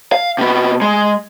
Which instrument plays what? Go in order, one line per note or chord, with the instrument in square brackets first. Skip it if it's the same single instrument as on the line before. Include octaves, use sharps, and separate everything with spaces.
[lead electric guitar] F5
C3 B3
G#3